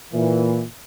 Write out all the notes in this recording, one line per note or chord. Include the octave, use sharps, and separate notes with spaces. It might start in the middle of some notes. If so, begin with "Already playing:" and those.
A#2 E3